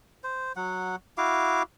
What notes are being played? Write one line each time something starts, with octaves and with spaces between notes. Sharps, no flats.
C5
F#3 F#5
E4 F#4 F5 D6